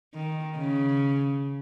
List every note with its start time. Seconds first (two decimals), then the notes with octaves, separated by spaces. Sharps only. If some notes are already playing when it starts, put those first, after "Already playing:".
0.14 D#3
0.57 C#3